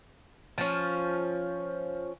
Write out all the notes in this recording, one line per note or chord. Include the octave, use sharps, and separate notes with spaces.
F3 C#4